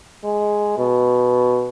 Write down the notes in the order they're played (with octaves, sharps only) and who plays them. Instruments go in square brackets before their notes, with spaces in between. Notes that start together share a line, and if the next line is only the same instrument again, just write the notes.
[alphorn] G#3
B2